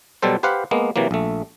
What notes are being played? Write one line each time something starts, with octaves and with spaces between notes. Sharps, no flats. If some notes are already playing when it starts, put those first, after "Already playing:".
B2 F#3 G3 A4 C5
G4 B4 C5 F5 F#5
G#3 A#3 B3
C3 E3 F#3 A#3
A#1 A3